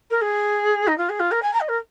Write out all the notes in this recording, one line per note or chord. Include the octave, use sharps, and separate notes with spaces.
A#4
G#4
D#4
F4
G#4
F4
A#4
G#5
A#5
D#5
A#4